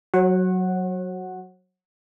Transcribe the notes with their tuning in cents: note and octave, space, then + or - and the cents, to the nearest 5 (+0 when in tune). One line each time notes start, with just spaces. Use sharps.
F#3 +0 C#5 -40 F#5 +0